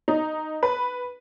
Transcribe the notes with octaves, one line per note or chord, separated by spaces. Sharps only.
D#4
B4